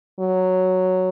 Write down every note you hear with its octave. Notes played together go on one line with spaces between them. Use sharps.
F#3